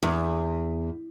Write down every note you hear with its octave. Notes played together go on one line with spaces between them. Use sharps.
E2